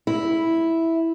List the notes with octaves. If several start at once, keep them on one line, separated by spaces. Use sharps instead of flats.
E4